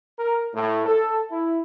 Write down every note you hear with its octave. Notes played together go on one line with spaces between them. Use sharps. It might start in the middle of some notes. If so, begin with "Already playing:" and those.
A#4
A2
A4
E4